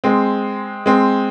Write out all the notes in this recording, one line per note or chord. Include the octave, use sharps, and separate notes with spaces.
G#3 C4
G#3 C4